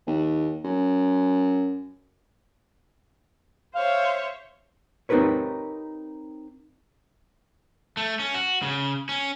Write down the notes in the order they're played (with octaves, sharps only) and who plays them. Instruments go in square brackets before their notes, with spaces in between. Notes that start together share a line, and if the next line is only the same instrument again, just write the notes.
[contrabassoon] D#2
F#2
[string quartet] C5 C#5 E5 [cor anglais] F5
[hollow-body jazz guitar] C4 D#4 G4 A#4 B4 C#5
[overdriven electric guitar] A3
C#4
F#4
C#3
C#4